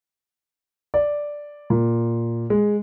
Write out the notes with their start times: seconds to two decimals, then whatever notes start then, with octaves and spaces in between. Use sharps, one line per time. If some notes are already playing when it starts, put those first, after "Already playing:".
0.94 D5
1.70 A#2
2.50 G#3